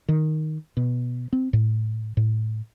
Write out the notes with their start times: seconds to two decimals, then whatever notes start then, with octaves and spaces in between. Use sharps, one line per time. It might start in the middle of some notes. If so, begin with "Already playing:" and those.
0.08 D#3
0.77 B2
1.33 C4
1.53 A2
2.17 A2